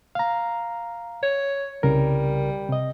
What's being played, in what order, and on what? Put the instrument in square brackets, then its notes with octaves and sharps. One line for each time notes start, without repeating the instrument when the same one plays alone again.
[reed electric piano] F5 A#5
[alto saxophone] C#5
[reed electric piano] C2 C#3 A#4 [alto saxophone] G3
[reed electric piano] C3 D#5